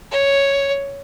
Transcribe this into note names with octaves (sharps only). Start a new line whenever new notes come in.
C#5